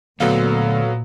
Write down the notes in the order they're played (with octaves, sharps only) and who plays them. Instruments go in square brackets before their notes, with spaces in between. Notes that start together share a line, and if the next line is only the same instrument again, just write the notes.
[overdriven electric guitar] D2 [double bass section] A#2 [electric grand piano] F#3 B3 F5 [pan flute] A4